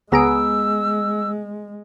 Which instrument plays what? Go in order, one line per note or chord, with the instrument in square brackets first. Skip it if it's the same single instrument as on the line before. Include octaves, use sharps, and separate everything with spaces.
[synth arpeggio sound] C#2 A#5 D7 [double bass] G#3 [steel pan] B3 G#4 [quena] E6